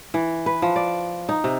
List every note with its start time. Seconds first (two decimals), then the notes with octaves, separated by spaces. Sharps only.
0.14 E3
0.46 B4
0.62 F3
0.76 D5
1.29 D#4
1.44 C3